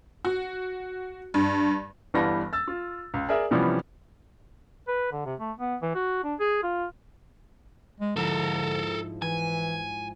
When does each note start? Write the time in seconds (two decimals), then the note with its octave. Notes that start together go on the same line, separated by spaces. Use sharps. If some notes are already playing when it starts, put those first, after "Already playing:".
0.25 F#4
1.34 G2
2.14 G1 E3 G3 B3 A5 A#6
2.53 E6 A6
2.68 F4
3.14 C#2
3.29 G#4 A#4 D5 E5
3.51 C3 E3 F3 G3 B3 C#4
4.88 B4
5.12 D3
5.26 C3
5.40 A3
5.59 B3
5.82 E3
5.95 F#4
6.24 D4
6.40 G#4
6.63 F4
8.00 G#3
8.17 G#2 D3 F3 E4 A4 A#4
9.22 E3 G#5